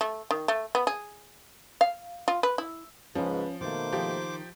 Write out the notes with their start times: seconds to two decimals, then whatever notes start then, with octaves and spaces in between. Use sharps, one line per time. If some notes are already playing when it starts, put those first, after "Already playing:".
0.01 A3
0.31 D#3
0.48 A3
0.75 B3
0.87 G#4
1.81 F5
2.28 F4
2.43 B4
2.58 E4
3.15 C#2 G#2 F3 C#4 B4
3.61 B2 D#3 A3 A#3 C5 D6
3.92 F3 G4